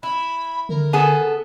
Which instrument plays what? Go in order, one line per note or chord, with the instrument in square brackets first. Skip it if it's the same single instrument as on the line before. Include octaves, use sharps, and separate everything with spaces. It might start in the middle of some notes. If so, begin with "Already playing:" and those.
[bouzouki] E4 [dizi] B5
[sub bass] D3 [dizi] A#4
[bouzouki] B3 A4 [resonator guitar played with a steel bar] G#4 G#5